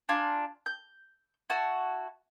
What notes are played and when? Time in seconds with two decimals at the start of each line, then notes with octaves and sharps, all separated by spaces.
0.09 D4 F4 G#5 A#5
0.66 G6
1.50 E4 F#4 A5